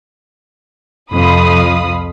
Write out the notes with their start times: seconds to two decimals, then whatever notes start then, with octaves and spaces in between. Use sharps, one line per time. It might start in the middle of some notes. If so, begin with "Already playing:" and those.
1.12 C2 F2 F5 B5 D#6